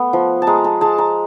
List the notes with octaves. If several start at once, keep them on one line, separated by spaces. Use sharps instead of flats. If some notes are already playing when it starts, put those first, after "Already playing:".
Already playing: A3 B3
F3
A5
G#3 A#5
A5
G#3 A5
A#5